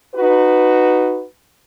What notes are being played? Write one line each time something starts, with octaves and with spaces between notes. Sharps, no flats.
D#4 F#4 B4